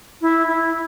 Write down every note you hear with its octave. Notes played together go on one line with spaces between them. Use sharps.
E4
E4